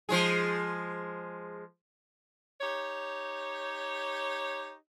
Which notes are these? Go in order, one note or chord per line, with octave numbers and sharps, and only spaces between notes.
F3 G#3 G#4
D#4 G4 C#5